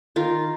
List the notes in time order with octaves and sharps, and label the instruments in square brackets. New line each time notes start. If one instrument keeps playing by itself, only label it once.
[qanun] D#3 F4 A#4